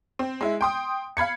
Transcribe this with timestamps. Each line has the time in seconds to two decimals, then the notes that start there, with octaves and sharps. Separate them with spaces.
0.19 C4
0.41 G#3 E4
0.61 G5 C6 D#6
1.17 F5 B5 G#6 C#7